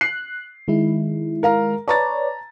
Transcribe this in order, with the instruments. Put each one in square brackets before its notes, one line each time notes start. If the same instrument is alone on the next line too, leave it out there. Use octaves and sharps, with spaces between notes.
[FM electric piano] F#6 [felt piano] C7
[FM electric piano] D#3 G#3 E4
[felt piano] A#4 F5 A#5
[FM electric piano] B4 C#5 D5 [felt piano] A5 A#5 A6